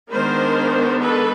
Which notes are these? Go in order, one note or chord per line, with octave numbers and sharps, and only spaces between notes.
D#3 G#3 B3 D4 A#4 C5
A4 B4